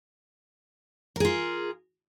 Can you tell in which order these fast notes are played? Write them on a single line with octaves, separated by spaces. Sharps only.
A#4 G#4 F4